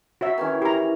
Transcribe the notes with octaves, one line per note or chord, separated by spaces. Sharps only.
F#4 C#5 E5
D#3 E3 C#4
E4 G4 A#5